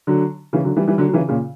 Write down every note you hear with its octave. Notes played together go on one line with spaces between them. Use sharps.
D3 F#3
C#3 E3
D3 F#3
E3 G3
E3 G3
D3 F#3
F#3
C#3 E3
A#2 C#3